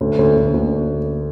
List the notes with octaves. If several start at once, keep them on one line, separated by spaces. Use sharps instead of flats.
D2
D2
D2
D2